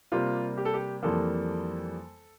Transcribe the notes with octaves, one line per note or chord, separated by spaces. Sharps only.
C3 G3 A#3 F4
G4
A4
G4
F2 E3 G3 A#3 A4